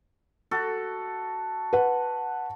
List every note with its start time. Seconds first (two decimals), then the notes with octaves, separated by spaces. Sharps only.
0.51 F#4 A4
1.73 B4 F#5